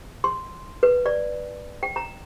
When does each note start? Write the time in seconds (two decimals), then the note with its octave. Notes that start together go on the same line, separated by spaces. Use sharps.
0.24 C6
0.83 B4
1.06 D5
1.83 G5
1.96 A#5